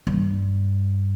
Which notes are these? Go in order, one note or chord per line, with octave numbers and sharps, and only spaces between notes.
G2